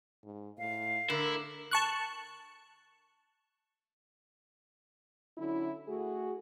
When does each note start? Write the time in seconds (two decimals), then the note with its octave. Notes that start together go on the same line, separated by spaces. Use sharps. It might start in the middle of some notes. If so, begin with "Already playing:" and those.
0.25 G#2
0.58 A2 F5
1.10 D3 E4 A#4
1.71 A5 C#6 F#6
5.37 D3 F#3 C#4 E4
5.87 A3 F#4 G#4